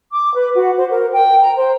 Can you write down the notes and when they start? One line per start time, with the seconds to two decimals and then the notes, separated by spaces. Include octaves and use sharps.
0.11 D6
0.34 B4
0.53 F#4
0.76 C5
0.90 A#4
1.12 G5
1.40 A#5
1.56 C5